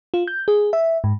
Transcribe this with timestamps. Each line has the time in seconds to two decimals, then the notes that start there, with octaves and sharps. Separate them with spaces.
0.14 F4
0.27 G6
0.48 G#4
0.73 E5
1.04 G#2